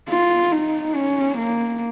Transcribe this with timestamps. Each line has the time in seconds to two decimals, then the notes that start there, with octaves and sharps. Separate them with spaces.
0.09 F4
0.52 D#4
0.95 C#4
1.38 A#3